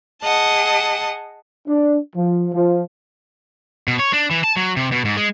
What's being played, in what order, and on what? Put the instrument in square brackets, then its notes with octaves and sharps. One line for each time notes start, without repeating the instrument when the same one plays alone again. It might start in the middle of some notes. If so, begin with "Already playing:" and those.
[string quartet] G#4 D#5 F#5 A5
[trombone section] D4
F3
F3
[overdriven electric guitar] B2
C#5
D4
E3
A5
F#3
C3
B2
G#2
G#3